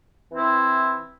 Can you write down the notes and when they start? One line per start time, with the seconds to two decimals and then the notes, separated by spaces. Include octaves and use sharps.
0.31 E3 C4 E4